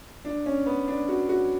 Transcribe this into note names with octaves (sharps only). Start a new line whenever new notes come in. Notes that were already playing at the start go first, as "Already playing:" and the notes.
D4
C#4
B3
D4
F#4
F#4